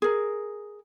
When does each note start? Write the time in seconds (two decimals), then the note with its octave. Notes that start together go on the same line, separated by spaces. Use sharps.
0.02 G#4 A#4